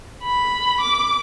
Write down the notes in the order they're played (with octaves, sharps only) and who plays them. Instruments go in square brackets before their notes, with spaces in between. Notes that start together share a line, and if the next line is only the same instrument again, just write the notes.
[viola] B5
D6